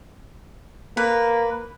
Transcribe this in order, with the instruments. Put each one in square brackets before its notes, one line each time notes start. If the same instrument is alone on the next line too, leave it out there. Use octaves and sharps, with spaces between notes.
[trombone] A#3 [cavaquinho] B4